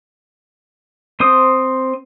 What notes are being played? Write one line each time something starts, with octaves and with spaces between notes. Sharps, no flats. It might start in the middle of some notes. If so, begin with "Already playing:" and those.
C4 C5 D#6